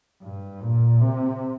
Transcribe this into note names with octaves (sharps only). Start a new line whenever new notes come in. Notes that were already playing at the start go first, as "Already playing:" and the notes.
G2
A#2
C3